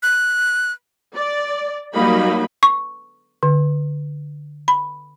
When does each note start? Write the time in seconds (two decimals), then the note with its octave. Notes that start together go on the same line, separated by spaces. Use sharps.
0.03 F#6
1.15 D5
1.93 F#3 G3 A#3 D#4 B5
2.63 C#6
3.43 D3
4.68 B5